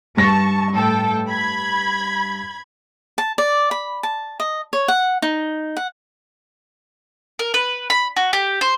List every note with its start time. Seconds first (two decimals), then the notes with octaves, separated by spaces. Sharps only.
0.17 G2 A5 C#6 A#6
0.73 A2 A4 G5
1.29 B5 G#6
3.18 A5
3.38 D5
3.71 B5
4.03 A5
4.40 D#5
4.73 C#5
4.88 F#5
5.22 D#4
5.77 F#5
7.39 A#4
7.54 B4
7.90 B5
8.16 F#4
8.33 G4
8.61 C5